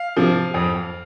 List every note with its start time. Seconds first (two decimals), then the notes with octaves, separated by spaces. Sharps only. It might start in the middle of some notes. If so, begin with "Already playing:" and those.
Already playing: F5
0.17 C3 F3
0.54 F2